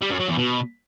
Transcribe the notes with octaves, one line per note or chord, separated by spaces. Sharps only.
G3
F#2
F#3
E2
B2